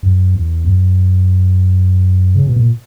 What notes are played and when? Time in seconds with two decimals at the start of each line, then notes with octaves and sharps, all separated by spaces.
0.03 F#2
0.34 E2
0.65 F#2
2.35 C#3
2.46 B2
2.56 A#2